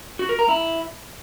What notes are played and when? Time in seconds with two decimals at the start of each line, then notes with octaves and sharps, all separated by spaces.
0.19 F#4
0.29 A#4
0.39 A#5
0.49 E4